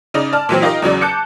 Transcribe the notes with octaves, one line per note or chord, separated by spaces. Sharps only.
C#3 D#4 D5
D5 A5 F6
A#2 E3 F#3 C4
D#4 F4 G4 A#4 D#5
E2 C#3 F#3 D5
A5 D6 F#6 G6 C#7